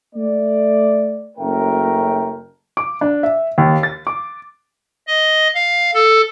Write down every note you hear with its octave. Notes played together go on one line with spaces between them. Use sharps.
A3 D5
F#1 F#2 A3 A#4 G5
D6
D4
E5
D#2
A6
D6
D#5
F5
A4